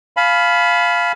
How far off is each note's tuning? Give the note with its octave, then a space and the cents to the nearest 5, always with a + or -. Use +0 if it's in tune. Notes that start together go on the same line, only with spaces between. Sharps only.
F5 +0 G#5 +45 B5 +0